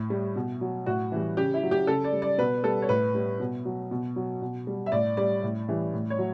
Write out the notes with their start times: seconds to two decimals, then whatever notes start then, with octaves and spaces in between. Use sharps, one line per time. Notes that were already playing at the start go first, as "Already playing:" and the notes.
Already playing: A2
0.10 G3
0.36 B2
0.61 F#3
0.86 A2 F#4
1.12 E3 G3
1.37 C#3 G4
1.54 E4
1.63 F#3
1.71 G4
1.87 C#3 A4
2.04 D5
2.13 G3
2.22 D5
2.38 B2 B4
2.63 G3 A4
2.82 C#5
2.89 A2 B4
3.15 G3
3.40 B2
3.65 F#3
3.91 B2
4.16 F#3
4.42 B2
4.67 G3
4.86 E5
4.92 A2 D5
5.17 G3 D5
5.43 A2
5.69 E3 G3
5.94 A2
6.10 C#5
6.18 F#3